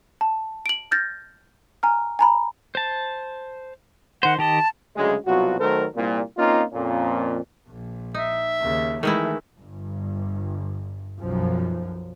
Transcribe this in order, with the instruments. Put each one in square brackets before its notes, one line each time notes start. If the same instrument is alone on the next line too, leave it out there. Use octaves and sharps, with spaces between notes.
[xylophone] A5
D7 F#7
F6 G6 A6 A#6
G#5 A#5 F6
G#5 A#5 B5
[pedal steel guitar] C5 A5
[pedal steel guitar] D#3 C5 [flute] F#5
[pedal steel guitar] D#3 G4 D#5 [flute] A5
[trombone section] D2 C#3 F#3 G#3
C2 B2 F#3 F4 F#4
D#3 F#3 A3 A4 A#4 C5
C2 A#2
A#3 C4 C#4 D#4 F4
F2 A#2 C#4
[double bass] A#1
[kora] D#4 [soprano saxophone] E5
[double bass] D#2 C#3
[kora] D#3 G#3 E4 [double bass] E3 A3
[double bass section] G1 G2
B1 F#2 F3